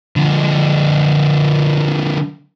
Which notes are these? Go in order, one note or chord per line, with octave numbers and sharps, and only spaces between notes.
D3 F3